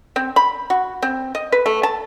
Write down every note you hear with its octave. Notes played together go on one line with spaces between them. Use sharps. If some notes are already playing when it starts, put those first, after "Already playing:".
C4
B5
F#4
C4
D#5
B4
A3
A5